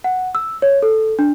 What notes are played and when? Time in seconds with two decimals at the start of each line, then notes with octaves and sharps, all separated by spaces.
0.04 F#5
0.35 E6
0.62 C#5
0.83 A4
1.19 D4